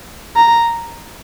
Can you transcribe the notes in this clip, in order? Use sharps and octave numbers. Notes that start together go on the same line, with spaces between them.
A#5